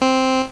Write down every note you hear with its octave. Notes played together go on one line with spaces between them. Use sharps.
C4